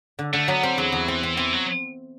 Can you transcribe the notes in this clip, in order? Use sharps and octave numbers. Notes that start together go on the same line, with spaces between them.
D3
D3 A3
F#3 B3
G3 C4
E2 F#3
E2
E3 C4
C4
E3 C4
F#3